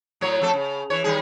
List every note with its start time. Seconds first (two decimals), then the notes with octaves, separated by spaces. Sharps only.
0.21 A2 F#3 C#5
0.41 F2 A3 A4
0.53 C#3
0.90 E3 C#5
1.04 D#3 G3 G#4